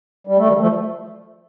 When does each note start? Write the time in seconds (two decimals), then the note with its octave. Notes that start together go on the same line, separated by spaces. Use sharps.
0.27 G3
0.38 A3
0.48 D#3 G3
0.61 F3 A3